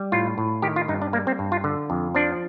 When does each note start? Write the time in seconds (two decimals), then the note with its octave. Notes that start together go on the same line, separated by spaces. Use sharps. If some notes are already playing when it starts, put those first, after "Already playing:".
Already playing: G3
0.12 A2 F4
0.38 A2
0.62 D#3 G4
0.76 F4
0.88 G2 D#4
1.02 D4
1.13 G3 A#3
1.27 C4
1.39 G2
1.52 F4
1.64 D3
1.90 F2
2.15 F3 D4